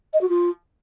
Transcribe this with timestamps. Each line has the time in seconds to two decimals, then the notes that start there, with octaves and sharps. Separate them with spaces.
0.13 D#5
0.21 F#4
0.29 F4